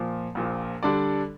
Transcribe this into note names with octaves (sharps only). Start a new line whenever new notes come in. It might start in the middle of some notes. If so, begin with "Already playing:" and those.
Already playing: A#2 F3
A#1 A#2 F3
D3 G3 D4 A4 D5